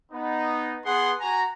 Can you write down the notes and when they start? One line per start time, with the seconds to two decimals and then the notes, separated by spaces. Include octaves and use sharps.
0.12 B3 D#4
0.85 B3 G#4 F#5 C6
1.19 F#4 G#5 A#5